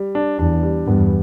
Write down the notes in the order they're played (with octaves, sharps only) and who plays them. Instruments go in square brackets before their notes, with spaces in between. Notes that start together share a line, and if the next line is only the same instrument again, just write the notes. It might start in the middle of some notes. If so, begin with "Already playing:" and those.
Already playing: [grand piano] G3
D4
[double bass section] E2 [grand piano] D4
[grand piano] G3
[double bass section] E2 G2 [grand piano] B3